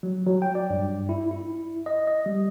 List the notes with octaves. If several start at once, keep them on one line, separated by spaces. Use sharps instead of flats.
F#3
F#3
G5
D5
G2
E4
E4
D#5
D#5
G3